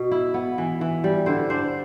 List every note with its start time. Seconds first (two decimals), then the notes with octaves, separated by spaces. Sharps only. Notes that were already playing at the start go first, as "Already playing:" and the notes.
Already playing: B2
0.11 E4
0.34 B3
0.58 E3
0.81 E3
1.04 G3
1.26 D3 C5
1.50 D4 C5